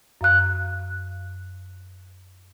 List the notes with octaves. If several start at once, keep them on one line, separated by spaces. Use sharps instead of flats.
F#2 F5 F#6